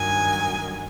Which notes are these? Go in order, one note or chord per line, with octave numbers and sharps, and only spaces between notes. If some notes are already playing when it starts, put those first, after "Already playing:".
Already playing: G2 D#3 F#3 G#5